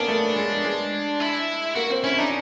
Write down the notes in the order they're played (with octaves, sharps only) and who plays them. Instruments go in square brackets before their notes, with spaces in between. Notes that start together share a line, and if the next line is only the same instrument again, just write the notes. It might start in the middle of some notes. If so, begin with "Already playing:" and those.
Already playing: [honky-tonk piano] A#3 B3 C#4 [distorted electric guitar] D4
[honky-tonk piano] A3
G#3
G#3
[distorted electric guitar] E4
[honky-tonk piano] A#3 [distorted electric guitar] F#4
[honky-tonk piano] C4
[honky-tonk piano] C#4 [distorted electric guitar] E4
[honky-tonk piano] D4 [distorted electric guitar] D#4